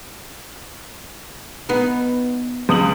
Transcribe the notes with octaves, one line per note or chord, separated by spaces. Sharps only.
B3 D#4
C#2 D#6 F#7